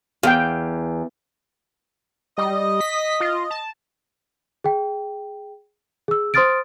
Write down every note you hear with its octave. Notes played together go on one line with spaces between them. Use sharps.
E2 F5 G5
G3 D#5
B6
F4
A5
G#4 G5
G#4 E6
C5 C6 D#6 F6 A6 D7